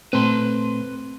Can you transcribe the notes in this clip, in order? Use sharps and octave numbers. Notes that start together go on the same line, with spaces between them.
A#2 A3 C4 B4 A5 C6